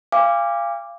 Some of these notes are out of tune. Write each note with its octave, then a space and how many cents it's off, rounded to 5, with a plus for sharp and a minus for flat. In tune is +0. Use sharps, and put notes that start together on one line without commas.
F5 -20 G#5 -45 D6 +0